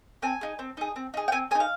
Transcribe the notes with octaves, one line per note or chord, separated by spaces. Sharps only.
C4 G#5
D#4 G#4
C4
D#4 G#4
C4
D#4 G#4
G5
C4 G#5
D#4 G#4 G#5
F5